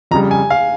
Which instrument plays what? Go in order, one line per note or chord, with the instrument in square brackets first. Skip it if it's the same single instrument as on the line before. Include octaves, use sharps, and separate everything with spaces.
[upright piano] F2 C#3 G3 [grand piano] A#5
[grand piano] G#5
F5